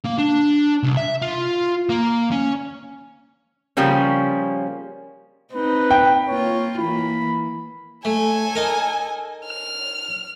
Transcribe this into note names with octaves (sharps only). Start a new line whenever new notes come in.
A#3
D4
C2
E5
F4
A#3
C#4
C#3 F3 G3 A#3 C#4
C4 D#4 B4
G5
A#3 F4 C#5
E3 A#3 B5
A3 A4 G#5
D#4 A#4
F6